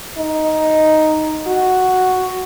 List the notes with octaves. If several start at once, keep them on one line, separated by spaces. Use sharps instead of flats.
D#4
F#4